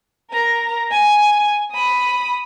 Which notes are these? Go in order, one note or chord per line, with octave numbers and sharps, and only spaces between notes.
A#4 A#5
G#5
B5 D#6